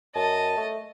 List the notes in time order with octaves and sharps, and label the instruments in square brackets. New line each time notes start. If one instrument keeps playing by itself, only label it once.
[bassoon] F#2 [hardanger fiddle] D#5 [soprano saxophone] A5
[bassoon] A3